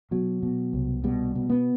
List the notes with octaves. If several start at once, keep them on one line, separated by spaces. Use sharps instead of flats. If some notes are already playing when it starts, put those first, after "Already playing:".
B2 F#3
B2
C2
B2 G3
B2
B3